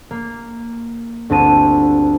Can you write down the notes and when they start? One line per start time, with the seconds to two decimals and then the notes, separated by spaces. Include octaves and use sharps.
0.11 A#3
1.30 G1 D2 C4 A5 D#7